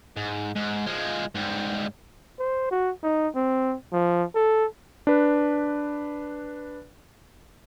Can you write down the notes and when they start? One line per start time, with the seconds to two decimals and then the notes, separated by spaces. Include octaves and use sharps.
0.17 G#2
0.55 G#2
0.87 F3 G#3
1.35 G#2 G3
2.39 C5
2.71 F#4
3.03 D#4
3.35 C4
3.93 F3
4.35 A4
5.07 D4 B4